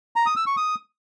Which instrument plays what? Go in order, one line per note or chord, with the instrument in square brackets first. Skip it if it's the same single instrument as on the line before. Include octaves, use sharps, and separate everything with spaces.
[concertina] A#5
D#6
E6
C#6
D#6